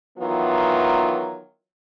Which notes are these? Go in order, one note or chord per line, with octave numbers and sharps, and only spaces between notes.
D#3 E3 F#3 B3 F4